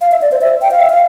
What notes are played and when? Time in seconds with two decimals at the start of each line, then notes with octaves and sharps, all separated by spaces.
0.01 F5
0.12 E5
0.22 D5
0.32 C5
0.41 E5
0.62 G5
0.71 F5
0.80 E5
0.90 F5